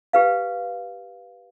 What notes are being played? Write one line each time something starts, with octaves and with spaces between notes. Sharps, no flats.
G4 B4 F5